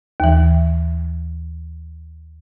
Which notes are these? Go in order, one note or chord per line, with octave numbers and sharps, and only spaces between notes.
D#2 E3